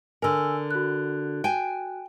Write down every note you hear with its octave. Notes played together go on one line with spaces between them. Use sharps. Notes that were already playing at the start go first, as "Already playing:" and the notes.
D3 A#4 G#5 E6
F#4 F#6
G5 G#5